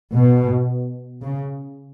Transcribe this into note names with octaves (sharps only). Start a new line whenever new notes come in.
B2
C#3